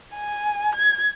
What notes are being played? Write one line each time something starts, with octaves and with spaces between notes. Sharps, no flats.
G#5
G#6